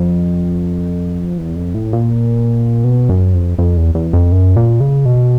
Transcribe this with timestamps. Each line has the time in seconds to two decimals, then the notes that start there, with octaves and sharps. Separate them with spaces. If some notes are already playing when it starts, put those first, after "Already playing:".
Already playing: F2
1.38 E2
1.56 F2
1.74 A2
1.93 A#2
2.84 B2
3.09 F#2
3.34 F2
3.58 F2
3.77 E2
3.95 E2
4.13 F2
4.32 F#2
4.56 A#2
4.80 C#3
5.05 B2